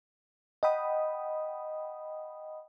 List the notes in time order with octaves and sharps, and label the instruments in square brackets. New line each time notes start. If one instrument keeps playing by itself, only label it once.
[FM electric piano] D#5 F#5 G5 B5 D#6